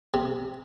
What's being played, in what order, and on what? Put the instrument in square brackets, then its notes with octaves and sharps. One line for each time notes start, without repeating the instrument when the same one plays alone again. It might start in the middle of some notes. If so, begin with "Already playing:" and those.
[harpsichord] C3